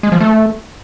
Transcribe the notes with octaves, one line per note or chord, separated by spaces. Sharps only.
G#3
F3
A3